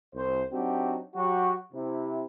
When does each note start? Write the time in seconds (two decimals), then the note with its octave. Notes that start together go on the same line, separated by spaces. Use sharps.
0.15 C2 C5
0.53 F#3 C4 D4 D#4 F#4 G4
1.15 F#3 F#4 G4
1.73 C3 E4